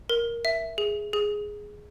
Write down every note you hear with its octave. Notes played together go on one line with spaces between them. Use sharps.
A#4
E5
G#4
G#4